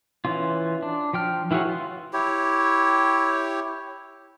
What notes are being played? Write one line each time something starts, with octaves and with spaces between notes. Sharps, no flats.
E3 C#4 F4
D4
F3 G5 F6
E3 E4 F#4 G#4 C#5
F4
E4 G4 C#5